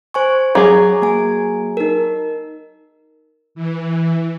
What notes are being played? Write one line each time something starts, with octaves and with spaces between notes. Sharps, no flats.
C5 G#5 C#6
F#3 G#4 D6
A#3 G#5
D#4 A#4
E3